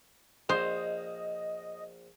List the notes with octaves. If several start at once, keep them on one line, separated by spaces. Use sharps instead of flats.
A#1 C5 D#5